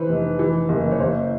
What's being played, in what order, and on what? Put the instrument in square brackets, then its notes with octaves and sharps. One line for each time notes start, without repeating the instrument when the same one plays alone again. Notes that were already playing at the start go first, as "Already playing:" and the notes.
Already playing: [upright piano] E3 B4 C5
F1
E3
F#1
C#5
F#1 C5